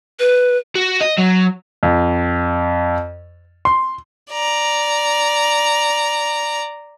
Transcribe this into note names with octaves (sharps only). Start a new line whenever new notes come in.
B4
F#4
D#5
F#3
F2
C6
D5 A#5